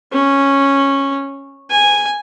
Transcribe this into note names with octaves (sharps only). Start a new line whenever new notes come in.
C#4
G#5